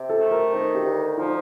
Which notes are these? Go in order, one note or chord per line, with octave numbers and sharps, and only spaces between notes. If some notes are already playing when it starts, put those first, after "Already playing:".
Already playing: C3
A4
A3
A#4
D#3 C5
G4
D2
F3 D#4